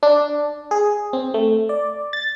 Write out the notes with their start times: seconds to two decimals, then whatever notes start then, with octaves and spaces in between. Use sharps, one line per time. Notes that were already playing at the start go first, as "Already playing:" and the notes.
0.03 D4
0.71 G#4
1.13 C4
1.34 A3
1.69 D5
2.13 A6